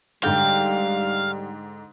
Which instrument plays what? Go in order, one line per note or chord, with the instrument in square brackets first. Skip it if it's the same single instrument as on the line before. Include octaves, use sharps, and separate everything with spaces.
[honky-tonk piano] G#2 D3 [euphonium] G3 [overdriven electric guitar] F5 [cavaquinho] G5